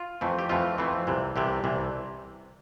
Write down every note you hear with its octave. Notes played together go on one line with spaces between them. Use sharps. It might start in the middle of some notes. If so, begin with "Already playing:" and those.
Already playing: F4
F2 E3 A3 C4
G4
F2 E3 A3 C4 F4
F2 E3 A3 C4
C2 C3 E3
C2 C3 E3 G4
C2 C3 E3